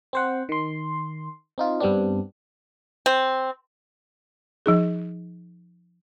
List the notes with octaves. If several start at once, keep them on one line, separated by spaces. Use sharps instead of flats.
C4 C5 F#5
D#3 C6
C4 D#4 F4
G2 G3 B3 C4 D4
C4
F3 D#4 G#4